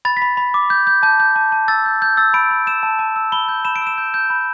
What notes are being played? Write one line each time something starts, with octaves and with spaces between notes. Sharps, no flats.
B5 A6
B6
B5
B5
D6
G6
G6
A5 G6
G6
A5
A5
E6 A6
G6
G6
E6 A6
B5 D7
B5
E6 E7
A5
A5
E6
B5 G7
G6
B5 E7
D7
E6
E7
G6
G6
B5